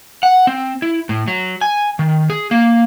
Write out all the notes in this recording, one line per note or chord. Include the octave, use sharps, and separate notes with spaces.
F#5
C4
E4
A2
F#3
G#5
D#3
G#4
A#3